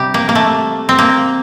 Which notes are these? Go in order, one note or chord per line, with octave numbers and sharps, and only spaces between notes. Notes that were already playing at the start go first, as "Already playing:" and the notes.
Already playing: C3 G3 G4
A#3
A#3
A3
C4
A#3